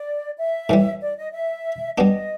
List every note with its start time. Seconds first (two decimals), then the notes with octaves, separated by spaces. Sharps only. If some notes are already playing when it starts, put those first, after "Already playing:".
Already playing: D5
0.37 E5
0.69 A2 E3 G3
1.02 D5
1.17 D#5
1.33 E5
1.97 G3 B3 D4 D#5